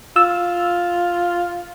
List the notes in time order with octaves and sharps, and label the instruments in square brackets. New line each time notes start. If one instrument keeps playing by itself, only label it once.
[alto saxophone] F4 [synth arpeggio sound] E6